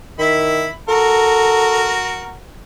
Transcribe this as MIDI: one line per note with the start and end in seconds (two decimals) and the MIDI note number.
0.19 0.68 51
0.19 0.70 64
0.19 0.70 83
0.89 2.39 66
0.89 1.95 69
0.89 2.39 70